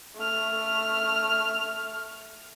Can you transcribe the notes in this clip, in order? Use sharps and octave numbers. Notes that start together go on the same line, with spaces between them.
A3 F6